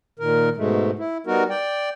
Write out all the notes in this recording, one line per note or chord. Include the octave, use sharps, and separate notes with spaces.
A#2 D#3 A#4
G#2 B2 G#3 A3
E4
G3 B3 D#4 F#4 A#4
D5 G5